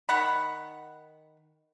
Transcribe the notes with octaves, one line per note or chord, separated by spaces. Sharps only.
D#3 F#5 B5